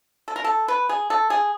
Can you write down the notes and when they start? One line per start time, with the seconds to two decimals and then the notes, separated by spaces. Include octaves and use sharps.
0.28 A4
0.36 A#4
0.44 A4
0.68 B4
0.89 G#4
1.10 A4
1.30 G#4